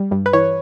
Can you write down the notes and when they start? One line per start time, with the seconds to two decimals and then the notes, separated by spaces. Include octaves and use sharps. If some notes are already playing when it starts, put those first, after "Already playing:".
Already playing: G3
0.11 G2
0.26 B4
0.33 E3 C#5